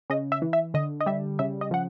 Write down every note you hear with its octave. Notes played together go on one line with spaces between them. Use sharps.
C#3 D#5
E5
E3
E5
D3 D#5
D#5
G3 E5
C#3 E5
D#5
F3 F#5